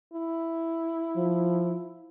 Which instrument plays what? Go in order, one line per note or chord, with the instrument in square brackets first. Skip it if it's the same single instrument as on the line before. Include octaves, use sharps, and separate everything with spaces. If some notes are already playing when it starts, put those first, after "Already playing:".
[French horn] E4
[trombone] F3